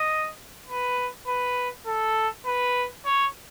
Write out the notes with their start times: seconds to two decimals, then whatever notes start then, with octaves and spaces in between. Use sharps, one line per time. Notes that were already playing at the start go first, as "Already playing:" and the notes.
Already playing: D#5
0.67 B4
1.27 B4
1.86 A4
2.46 B4
3.06 C#5